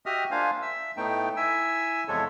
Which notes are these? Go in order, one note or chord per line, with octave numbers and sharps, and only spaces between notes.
F#4 G4 D#5 E5 D#6 F6
A#3 D4 F4 C5 F5 G#5
E5 E6
A2 A3 B3 D#4 G5
E4 E5 G#5 E6
E2 C3 F3 G#3 A4 C#5